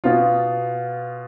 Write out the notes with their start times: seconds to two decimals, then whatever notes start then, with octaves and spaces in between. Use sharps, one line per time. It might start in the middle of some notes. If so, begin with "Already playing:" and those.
0.04 B2 B3 F4